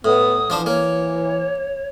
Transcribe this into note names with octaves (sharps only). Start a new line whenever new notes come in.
A2 B3 D#6
E3 F3 D4 C5
A#3 C#5